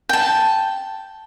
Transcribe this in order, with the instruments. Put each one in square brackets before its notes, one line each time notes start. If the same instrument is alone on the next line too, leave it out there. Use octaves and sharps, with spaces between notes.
[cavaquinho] G5 A5